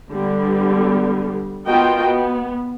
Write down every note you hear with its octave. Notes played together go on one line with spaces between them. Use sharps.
D3 G3 B3
B3 F4 F#4 A#4 D#5 G5
B3